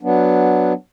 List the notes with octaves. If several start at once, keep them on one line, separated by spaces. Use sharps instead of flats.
F#3 B3 D4